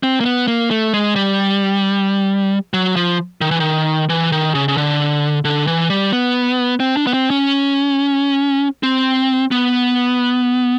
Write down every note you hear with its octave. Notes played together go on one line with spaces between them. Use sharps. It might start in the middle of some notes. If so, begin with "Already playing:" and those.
C4
A#3
B3
A#3
A3
G#3
G3
F#3
F3
D#3
E3
D#3
E3
D#3
C#3
C#3
D3
D3
E3
G3
B3
C4
D4
B3
C4
C#4
C4
B3